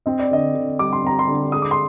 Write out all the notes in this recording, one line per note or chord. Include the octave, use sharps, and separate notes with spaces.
C4 D#5
D5
D3 D#5
D3
G3 D6
C6
C4 A#5
C6
D3
G#3 D#6
D6
C6